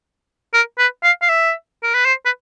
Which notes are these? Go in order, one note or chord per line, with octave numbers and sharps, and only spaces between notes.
A#4
B4
F5
F5
E5
A#4
B4
C5
B4